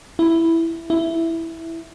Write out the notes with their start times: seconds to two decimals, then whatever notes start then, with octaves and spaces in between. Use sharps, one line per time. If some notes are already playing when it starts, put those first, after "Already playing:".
0.19 E4
0.90 E4